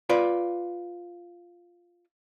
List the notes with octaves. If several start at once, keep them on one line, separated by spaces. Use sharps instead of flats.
F4 B4 D5